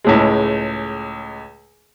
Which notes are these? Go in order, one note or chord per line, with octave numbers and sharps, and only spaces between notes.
C#2 A2 G#3